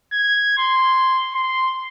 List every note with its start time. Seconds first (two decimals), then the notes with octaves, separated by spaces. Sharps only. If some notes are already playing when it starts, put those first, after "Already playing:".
0.13 G#6
0.58 C6
1.34 C6